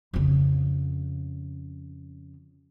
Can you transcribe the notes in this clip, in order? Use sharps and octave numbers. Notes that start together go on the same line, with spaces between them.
F2 C#3